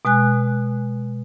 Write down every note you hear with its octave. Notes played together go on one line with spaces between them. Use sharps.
B2 G#3 G#5 F#6